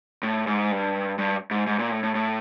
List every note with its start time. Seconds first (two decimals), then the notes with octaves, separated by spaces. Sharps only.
0.23 A2
0.47 G#2
0.71 G2
1.19 G2
1.51 G#2
1.67 G#2
1.79 A#2
1.91 A2
2.03 A2
2.15 A2